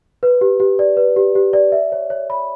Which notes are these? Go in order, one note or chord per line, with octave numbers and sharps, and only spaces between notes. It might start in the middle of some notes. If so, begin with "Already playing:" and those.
B4
G4
G4
D5
B4
G4
G4
D5
E5
C#5
C#5
B5